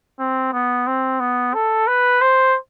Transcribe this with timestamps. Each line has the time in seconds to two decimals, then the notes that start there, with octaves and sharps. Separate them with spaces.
0.20 C4
0.53 B3
0.87 C4
1.20 B3
1.54 A4
1.87 B4
2.21 C5